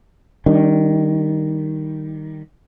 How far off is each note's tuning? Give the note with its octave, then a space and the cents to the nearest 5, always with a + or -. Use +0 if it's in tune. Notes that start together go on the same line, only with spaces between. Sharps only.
D#3 +0 G3 +0 D4 -30